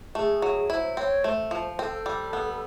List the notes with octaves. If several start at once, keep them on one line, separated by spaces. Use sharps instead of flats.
A3 G#4
F#3
E4 C5 C#5
C4 C#5
A3 C5
F3
C4 A4
G3
B3